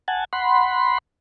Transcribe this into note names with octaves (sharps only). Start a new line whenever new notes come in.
F#5 G#5 A5
F#5 B5 C6